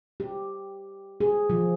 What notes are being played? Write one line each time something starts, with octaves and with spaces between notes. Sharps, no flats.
G4
G#4
F3